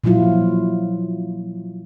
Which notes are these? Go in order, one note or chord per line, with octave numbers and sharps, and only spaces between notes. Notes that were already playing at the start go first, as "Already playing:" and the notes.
A#2 F3 F#3 E4 F4